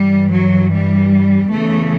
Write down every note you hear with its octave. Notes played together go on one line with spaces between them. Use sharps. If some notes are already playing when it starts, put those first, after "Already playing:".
Already playing: G2 E3 G3
F#3
G3
E2 C#3 E3 A3